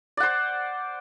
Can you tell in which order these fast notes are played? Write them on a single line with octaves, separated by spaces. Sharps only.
D5 F#5 C5